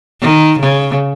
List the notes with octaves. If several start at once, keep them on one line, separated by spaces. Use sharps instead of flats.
D#3
C#3